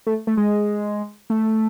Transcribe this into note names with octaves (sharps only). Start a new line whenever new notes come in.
A3
A3
G#3
A3